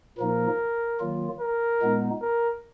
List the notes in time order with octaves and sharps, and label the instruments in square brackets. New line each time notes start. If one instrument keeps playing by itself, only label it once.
[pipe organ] A#2 F3 A#3 D#4 [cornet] A#4
[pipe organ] D#3 F#3 A#3 F4
[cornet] A#4
[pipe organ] A#2 G#3 B3 D#4
[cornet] A#4